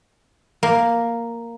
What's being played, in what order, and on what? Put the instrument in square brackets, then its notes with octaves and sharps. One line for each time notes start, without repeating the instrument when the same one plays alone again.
[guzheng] A#3